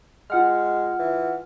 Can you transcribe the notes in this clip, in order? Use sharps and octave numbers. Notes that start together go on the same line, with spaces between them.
G#3 F4 F#5 F6
E3